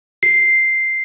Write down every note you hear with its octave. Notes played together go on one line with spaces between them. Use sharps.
C7